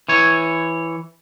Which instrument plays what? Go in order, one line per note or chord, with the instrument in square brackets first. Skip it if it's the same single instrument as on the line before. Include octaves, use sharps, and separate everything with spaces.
[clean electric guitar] E3 C#5